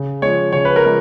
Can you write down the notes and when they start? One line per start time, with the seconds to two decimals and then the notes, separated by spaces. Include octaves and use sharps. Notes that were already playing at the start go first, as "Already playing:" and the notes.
Already playing: C#3
0.22 F3 G#3 C#5
0.53 C#3 C#5
0.65 B4
0.76 A#4
0.85 F3 G#3